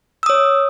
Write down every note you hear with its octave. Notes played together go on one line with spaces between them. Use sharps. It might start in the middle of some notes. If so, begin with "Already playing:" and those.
C#5 D#6 E6